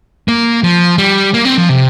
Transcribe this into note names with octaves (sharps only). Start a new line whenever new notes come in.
A#3
F3
G3
A#3
C4
F3
C3